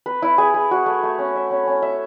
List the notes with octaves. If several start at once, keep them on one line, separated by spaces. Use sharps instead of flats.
B4
E4
G#4
G#4
F#4
A3
A3
C#4
E5
C#4
C#4
E5